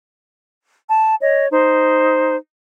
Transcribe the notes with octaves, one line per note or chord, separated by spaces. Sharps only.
A5
C#5 D#5
D#4 C5